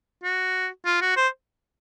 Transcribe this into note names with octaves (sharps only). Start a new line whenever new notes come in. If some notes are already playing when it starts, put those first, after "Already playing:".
F#4
F4
F#4
C5